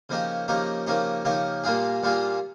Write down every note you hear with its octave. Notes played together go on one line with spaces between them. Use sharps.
C#3 F3 A#3 D#4 G4
C#3 F3 A#3 D#4 G4
C#3 F3 A#3 D#4 G4
C#3 F3 A#3 D#4 G4
A#2 G3 A#3 F4 G#4
A#2 G3 A#3 F4 G#4